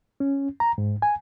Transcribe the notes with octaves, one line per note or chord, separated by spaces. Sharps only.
C#4
A#5
G#2
G#5